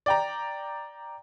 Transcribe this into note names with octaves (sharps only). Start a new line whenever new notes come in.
D5 G5 A#5